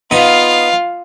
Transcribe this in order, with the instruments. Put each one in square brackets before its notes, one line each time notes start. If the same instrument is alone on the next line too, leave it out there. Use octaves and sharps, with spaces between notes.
[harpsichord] B3 D#4 B5 [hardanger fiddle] F4 F5